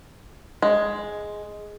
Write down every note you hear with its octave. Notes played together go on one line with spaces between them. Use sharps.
G#3